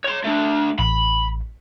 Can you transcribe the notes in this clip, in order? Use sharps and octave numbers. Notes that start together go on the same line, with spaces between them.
C#5 C6
A3 D4
A1 B5